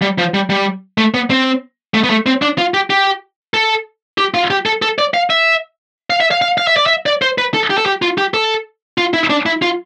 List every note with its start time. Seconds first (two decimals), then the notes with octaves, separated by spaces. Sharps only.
0.02 G3
0.18 F3
0.34 G3
0.50 G3
0.98 A3
1.14 B3
1.30 C4
1.94 A3
2.04 B3
2.10 A3
2.26 C4
2.42 D4
2.58 F4
2.74 G4
2.90 G4
3.54 A4
4.18 G4
4.34 F4
4.50 G4
4.66 A4
4.82 A4
4.98 D5
5.14 F5
5.30 E5
6.10 F5
6.21 E5
6.31 F5
6.42 F5
6.58 F5
6.67 E5
6.77 D5
6.86 E5
7.06 D5
7.22 C5
7.38 B4
7.54 A4
7.70 G4
7.78 A4
7.86 G4
8.02 F4
8.18 G4
8.34 A4
8.98 F4
9.14 E4
9.30 D4
9.46 E4
9.62 F4